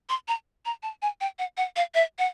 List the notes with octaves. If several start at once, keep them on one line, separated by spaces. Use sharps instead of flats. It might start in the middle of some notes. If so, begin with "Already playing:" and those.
C6
A#5
A#5
A5
G#5
G5
F#5
F#5
F5
E5
F#5